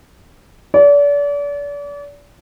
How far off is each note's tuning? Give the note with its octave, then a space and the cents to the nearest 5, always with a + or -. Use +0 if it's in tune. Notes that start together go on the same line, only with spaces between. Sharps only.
D5 -35